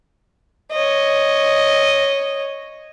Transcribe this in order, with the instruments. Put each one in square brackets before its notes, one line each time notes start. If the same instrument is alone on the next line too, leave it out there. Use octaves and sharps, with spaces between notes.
[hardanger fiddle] C#5 D#5